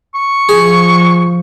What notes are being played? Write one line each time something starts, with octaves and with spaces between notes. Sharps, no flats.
C#6
F3 G#4